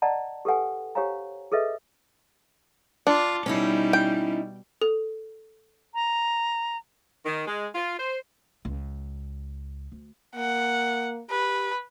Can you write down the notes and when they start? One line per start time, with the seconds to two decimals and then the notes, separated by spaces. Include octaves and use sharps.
0.02 D5 D#5 F#5 A5 A#5
0.45 G4 A4 B4 F#5 G#5
0.95 G4 C5 C#5 F5 G#5 A#5
1.52 G#4 A4 B4 D#5 E5
3.07 D4 F4
3.46 B2 G3 C#4 D#4 E4
3.93 G5
4.82 A4
5.94 A#5
7.25 D#3
7.46 G#3
7.75 F4
7.98 C5
8.65 C#2
9.92 D2
10.36 A#3 F#5
11.30 G4 B4